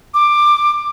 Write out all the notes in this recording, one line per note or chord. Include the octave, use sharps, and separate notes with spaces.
D6